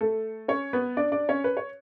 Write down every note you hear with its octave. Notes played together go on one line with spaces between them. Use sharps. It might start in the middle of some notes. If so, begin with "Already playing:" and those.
A3 A4
C#4 C#5
B3 B4
D4 D5
D4 D5
C#4 C#5
B4
C#5